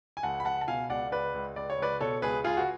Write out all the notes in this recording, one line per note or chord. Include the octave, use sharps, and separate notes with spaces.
G#5
C#2 F#5 A5
B5
C#2 F#5 A5
A5
B2 F5 G#5
C#2 D5 F#5
C#2 B4 D5
C#2
C#2 D5
C#5
C#2 B4 D5
B2 A4 C#5
C#2 G#4 B4
C#2 F4 G#4
F#4